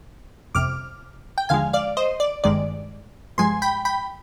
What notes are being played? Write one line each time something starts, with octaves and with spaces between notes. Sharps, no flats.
G1 F2 C3 D6 F6
G5
D#2 D3 F3 G#3 F5 G#5
D5 F5
C5 D#5
D5
G1 G2 D#3 G#3 D5
G2 F3 G#3 G#5 C6
G5 B5
G5 B5